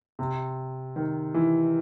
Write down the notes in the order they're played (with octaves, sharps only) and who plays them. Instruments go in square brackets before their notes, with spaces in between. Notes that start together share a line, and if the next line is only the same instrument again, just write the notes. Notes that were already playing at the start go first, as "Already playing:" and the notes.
[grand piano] C3
D#3
E3